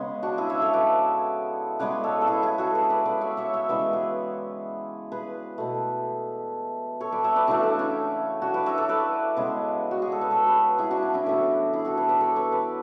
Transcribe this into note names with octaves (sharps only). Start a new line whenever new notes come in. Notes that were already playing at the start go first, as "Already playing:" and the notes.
Already playing: C#3 G#3 B3
D4 F#4
E4 G#4
C#5 E5
A4 C#5
B4 D5
C#3 G#3 B3 B4 D5
A4 C#5
A4
E4 G#4
E4 G#4
F#4 A4
G#4 B4
B4 D5
B4 D5
C#5 E5
C#5 E5
C#5 E5
C#3 E3 G#3 B3 B4 D5
G#4 B4
G#4 B4
B2 A3
A4 C#5
B4 D5
C#5 E5
B4 D5
C#3 E3 A3 D4 F#4
D4
C#4 E4
D4 F#4
B4 D5
C#5 E5
A4 C#5
B4 D5
C#3 G#3 B3
F#4
G#4
A4
B4
A4 C#5
G#4 B4
E4 G#4
D4 F#4
D4
C#4 E4
A2 E3 B3 D4 F#4
E4 G#4
F#4 A4
G#4 B4
B4 D5
A4 C#5
A4 C#5
B4 D5